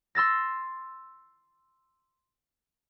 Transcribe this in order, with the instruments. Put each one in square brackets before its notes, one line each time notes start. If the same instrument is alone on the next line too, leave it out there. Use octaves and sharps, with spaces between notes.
[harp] C6 E6 A6 A#6